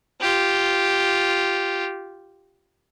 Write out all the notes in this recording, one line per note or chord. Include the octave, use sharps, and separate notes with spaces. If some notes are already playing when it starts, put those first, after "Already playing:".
F4 G4